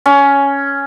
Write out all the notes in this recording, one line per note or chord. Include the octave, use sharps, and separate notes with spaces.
C#4